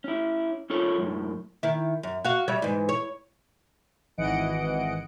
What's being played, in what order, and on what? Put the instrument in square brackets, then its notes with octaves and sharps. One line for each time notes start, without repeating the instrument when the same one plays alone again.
[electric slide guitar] C#4 E4
C#4 F4 A4 C#5
F#2 A2
[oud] D#3 E4
F#2
F#4 F5
G3 C#5 E5
G#2 E3
C#5
[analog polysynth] G#1 E3 D#5 F#5 C#7 D7